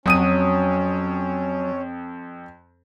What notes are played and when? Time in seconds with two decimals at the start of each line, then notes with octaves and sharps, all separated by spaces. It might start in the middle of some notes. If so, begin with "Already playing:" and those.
0.06 F2 F#3 C#4 D#6 D#7